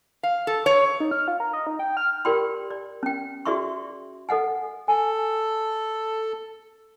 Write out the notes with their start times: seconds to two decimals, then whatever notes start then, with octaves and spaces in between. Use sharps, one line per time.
0.23 F5
0.47 A4
0.66 C#5
1.00 D#4
1.11 F6
1.28 F4
1.40 A#4
1.53 D#5
1.67 D#4
1.79 G5
1.97 F6
2.25 G4 A#4 D5 G5 B5 C6
2.70 D5
3.03 C#4 G5
3.46 F#4 G#4 D5 E5 C6 C#6
4.29 A4 D#5 F#5 G#5
4.88 A4 G#5